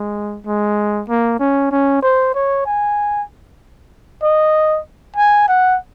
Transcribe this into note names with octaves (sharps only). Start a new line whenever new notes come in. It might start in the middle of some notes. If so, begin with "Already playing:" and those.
Already playing: G#3
G#3
A#3
C#4
C#4
C5
C#5
G#5
D#5
G#5
F#5